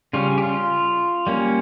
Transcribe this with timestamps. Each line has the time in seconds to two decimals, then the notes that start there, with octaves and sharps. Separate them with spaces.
0.13 C#3 G3 C#4 F4
0.38 G4
0.42 F4
1.27 G3 A#3 C#4